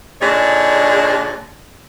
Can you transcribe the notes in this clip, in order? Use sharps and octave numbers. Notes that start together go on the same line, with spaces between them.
A#2 D3 D4 D#4 G#4 C#5